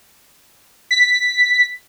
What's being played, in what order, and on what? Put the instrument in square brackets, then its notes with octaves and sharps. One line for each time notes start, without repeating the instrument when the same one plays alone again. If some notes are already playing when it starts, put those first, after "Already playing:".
[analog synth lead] B6